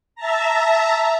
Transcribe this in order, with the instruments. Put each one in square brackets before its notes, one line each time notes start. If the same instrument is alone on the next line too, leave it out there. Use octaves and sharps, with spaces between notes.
[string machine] E5 A5 A#5